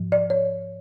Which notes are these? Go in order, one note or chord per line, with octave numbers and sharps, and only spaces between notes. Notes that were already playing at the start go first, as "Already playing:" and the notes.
Already playing: G#2 F3
D5
C#5